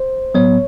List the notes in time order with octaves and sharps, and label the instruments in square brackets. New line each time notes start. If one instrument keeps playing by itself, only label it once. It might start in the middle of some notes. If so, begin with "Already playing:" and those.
Already playing: [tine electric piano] C5
A2 F#3 B3 C#5